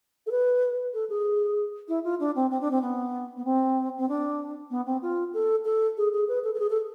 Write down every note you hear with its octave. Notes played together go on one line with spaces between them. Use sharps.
A4
B4
A4
G#4
E4
F4
D4
C4
C4
D4
C4
B3
B3
C4
C4
D4
B3
C4
F4
A4
A4
G#4
G#4
B4
A4
A4
G#4
A4